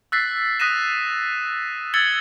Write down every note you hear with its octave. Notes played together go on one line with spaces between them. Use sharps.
E6 F#6 A6 B6 C7
D#6 F#6 A#6 B6 D#7 E7
E6 G#6 A6 C#7 F#7 G7